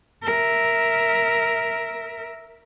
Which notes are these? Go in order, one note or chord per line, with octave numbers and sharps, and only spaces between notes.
A#4 E5